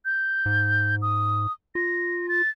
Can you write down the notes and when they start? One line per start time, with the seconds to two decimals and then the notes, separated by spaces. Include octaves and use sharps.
0.05 G6
0.46 G#2
1.02 D#6
1.75 F4 A#6
2.29 A6